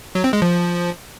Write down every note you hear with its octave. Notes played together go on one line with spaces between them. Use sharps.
F#3
C4
G#3
F3